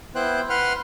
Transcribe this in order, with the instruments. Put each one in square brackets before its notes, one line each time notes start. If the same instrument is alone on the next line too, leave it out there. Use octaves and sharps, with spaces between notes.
[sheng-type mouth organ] B3 E4 C5 G5 F#6
B4 F#5 C6 F6